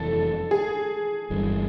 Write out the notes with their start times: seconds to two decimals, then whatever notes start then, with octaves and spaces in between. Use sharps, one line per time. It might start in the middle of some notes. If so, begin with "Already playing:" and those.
Already playing: F1 F2 E3 A4
0.51 G#4
1.30 G1 G2 E3